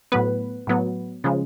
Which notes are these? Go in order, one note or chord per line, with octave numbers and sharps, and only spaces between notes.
A2 F#3 B3 B4
A2 F#3 B3
C#3 F3 G#3